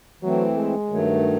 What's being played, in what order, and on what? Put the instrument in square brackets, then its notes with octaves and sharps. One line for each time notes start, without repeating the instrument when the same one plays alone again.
[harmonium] E3 A3 C4 [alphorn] F#3
[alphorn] G#3
[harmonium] G2 D#3 F#3 A3